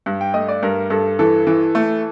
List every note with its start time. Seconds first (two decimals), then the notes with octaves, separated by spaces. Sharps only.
0.06 G2
0.21 G5
0.34 A3 D#5
0.48 D5
0.63 G2 A#4
0.90 G2 A4
1.19 E3 A4
1.47 E3
1.75 A3